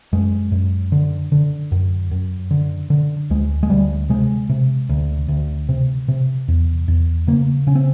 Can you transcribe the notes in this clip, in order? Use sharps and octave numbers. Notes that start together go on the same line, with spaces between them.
F#2 G#3
F#2
D3
D3
F#2
F#2
D3
D3
D2 G#3
G#3
D2 G3
C3 G#3
C3
D2
D2
C3
C3
E2
E2
C#3 A#3
C#3 C#4
C4